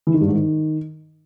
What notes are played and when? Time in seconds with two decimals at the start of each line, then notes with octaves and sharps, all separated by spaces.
0.07 E3
0.14 D#3
0.21 G2
0.28 G#2
0.35 D#3